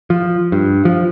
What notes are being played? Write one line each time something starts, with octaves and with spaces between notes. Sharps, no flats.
F3
G2
F3